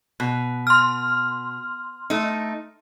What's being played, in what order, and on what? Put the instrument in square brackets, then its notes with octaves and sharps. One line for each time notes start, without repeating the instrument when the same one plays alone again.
[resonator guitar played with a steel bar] B2
[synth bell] C6 F6
[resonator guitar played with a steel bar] A3 D#4